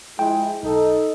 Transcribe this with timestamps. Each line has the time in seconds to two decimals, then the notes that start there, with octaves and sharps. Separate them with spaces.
0.19 F3 G#3 E4 G5
0.63 B1 D#4 A4